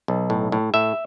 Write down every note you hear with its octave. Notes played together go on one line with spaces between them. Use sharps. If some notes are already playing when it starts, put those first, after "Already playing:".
B1
A2
A2
A2 E5